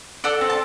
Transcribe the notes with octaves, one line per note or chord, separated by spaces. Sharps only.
A4 D5 F#5
C4
A5